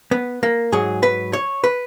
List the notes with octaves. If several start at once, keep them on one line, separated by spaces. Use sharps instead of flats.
B3
A#3
G#2 F#3 G#4
B4
C#5
B4